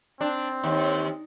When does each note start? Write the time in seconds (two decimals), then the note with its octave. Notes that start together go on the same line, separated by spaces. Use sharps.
0.21 C4 D4
0.64 D#2